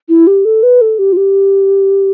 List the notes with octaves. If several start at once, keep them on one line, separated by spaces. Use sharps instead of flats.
E4
G4
A4
B4
A4
G4
F4
G4